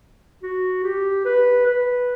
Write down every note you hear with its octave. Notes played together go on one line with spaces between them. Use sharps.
F#4
G4
B4
B4